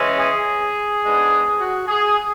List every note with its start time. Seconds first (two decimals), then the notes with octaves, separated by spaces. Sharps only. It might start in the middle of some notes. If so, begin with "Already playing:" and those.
Already playing: C#3 E3 G#3 C#4
0.19 G#4
1.03 G#2 G#3 B3 D4
1.59 F#4
1.88 G#4